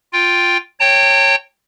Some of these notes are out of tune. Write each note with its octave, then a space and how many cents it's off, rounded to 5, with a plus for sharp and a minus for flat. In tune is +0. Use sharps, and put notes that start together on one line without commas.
F4 +5 G5 +0
C#5 -10 G5 +0 A#5 -45